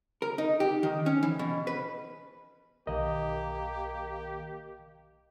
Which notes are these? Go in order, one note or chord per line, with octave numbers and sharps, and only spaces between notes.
A#4
D#4
G4
D#3
C#4
E3
B2
B4
B1 D#3 A#3 G4 D#5